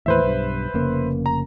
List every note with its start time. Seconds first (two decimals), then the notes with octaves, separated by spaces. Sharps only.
0.06 D#2 A2 E3 B4 C5 E5
0.23 B1 G2
0.74 F1 C#3 A#3
1.26 A#5